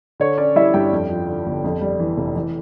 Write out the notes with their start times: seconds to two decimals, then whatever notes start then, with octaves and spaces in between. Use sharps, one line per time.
0.20 D3 C#5
0.38 C#4 D5
0.55 G3 E4 E5
0.74 G2 G4 G5
0.93 F2
1.10 F3
1.27 D3
1.46 G1
1.64 F2
1.82 G3
2.00 E3
2.17 F1
2.36 E3